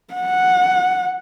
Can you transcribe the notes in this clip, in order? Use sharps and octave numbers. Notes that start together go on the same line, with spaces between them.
F#5